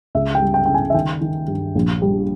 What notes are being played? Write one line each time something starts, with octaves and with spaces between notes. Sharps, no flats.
C#2 E5
G5
G3
G5
C#3 G5
G#5
E5
D#3 G5
D#3
G2
A#1
G3